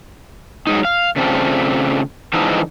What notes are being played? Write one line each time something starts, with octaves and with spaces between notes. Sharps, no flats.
F#3 G#3 D#4
F5
C#3 A3 C4 D4 F4
D3 E3 F3 G#3 D#4 A4